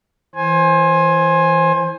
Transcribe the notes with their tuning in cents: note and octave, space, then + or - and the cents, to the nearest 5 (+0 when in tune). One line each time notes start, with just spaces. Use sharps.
E3 +0 C5 +25 G#5 +0